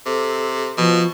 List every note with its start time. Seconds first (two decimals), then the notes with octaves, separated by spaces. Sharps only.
0.06 C3 A4
0.78 B2 F3